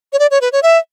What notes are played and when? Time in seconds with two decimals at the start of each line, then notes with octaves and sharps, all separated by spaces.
0.13 C#5
0.19 D5
0.31 C#5
0.41 B4
0.52 C#5
0.63 E5